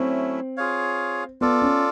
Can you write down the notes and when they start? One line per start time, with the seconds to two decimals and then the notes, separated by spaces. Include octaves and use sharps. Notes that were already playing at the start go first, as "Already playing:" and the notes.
Already playing: F#3 A3 C4 C#4 E4
0.57 F4 G#4 C#5 F5
1.41 B3 F4 A4 D5
1.62 C#4